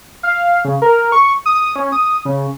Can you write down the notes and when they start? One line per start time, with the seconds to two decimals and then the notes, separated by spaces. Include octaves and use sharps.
0.23 F5
0.65 C#3
0.82 A#4
1.12 C#6
1.46 D#6
1.76 C#4
1.92 D#6
2.25 C#3